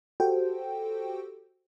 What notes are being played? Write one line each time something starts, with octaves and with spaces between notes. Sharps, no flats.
F#4 G4 A4 C5 G5